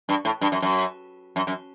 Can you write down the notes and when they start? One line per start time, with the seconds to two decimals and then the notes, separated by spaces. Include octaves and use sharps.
0.09 G2
0.25 A2
0.41 G2
0.52 F#2
0.62 F#2
1.36 F#2
1.47 F#2